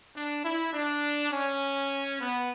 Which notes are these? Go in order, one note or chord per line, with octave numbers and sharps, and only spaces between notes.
D4
E4
D4
C#4
B3